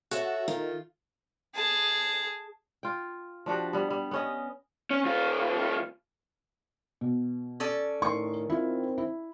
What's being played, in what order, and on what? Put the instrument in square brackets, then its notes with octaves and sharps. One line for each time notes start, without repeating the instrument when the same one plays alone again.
[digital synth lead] F#4 [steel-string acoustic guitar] A4 C#5 E5
[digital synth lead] D#3 [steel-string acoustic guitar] F4
[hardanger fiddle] G#4 A5
[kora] F4 G5
F3 D4 F#4 G4
G3 B3
G3
B3 C#4 D#5
[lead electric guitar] C#4
D#2 F4
[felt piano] B2
[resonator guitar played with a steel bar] C#4 A4 D5
[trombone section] A2 D#3 [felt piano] C6 C#6
[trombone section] D#3 C4 [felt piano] E4 F4
[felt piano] E4